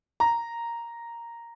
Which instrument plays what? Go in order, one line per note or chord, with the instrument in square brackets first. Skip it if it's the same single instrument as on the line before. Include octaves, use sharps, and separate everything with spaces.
[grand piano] A#5